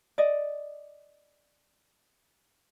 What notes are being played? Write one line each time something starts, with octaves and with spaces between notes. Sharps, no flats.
D5 D#5